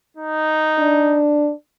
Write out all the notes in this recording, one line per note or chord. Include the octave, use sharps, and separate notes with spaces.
D#4
D4